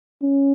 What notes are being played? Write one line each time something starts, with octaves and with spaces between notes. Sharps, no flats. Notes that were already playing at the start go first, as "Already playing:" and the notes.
C#4